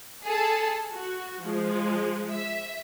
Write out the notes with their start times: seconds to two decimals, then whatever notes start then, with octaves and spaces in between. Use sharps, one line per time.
0.24 G#4 A4 A5
0.91 F#4
1.42 F3 G#3
2.31 E5